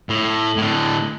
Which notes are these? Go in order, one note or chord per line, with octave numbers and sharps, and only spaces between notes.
A2
A2 D3